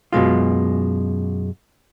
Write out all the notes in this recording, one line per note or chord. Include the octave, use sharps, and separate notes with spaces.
F#2 B2 G#3 F4